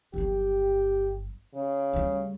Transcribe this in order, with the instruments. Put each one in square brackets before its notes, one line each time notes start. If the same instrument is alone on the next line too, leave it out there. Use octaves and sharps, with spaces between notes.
[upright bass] G1 F#3 [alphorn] G4
[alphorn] C#3
[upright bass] D2 G3